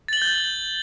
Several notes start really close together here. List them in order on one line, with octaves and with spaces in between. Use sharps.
A6 F#7 G7 G6